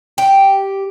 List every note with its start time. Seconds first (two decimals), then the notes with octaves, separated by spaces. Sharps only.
0.18 G4